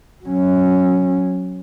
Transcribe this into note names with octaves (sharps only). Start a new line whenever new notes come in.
F#3 C#4